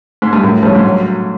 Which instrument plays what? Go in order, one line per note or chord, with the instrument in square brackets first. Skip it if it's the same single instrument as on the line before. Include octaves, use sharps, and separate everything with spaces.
[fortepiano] G#2
G2
[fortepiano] F#2 [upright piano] A2
[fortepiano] G2 [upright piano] F3 A3 C#4
[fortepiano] G#2
[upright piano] F#3